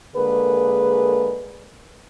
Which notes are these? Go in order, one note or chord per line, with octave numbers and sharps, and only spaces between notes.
D3 G#3 A#3 G#4 A#4 B4